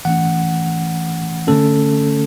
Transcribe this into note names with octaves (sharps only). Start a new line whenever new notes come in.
E3 A3 C#4 F#5
D3 A3 C#4 A4